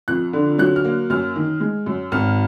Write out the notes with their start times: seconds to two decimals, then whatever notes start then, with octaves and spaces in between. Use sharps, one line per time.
0.08 F2 F#6
0.33 D3
0.58 F#3 F#6
0.76 F6
0.85 A#3
1.10 F#2 F6
1.36 D#3
1.60 G#3
1.86 F#2
2.12 G#1 F6